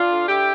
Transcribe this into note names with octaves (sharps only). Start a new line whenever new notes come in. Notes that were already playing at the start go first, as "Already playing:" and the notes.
Already playing: D4 F4
D3
D3 E4 G4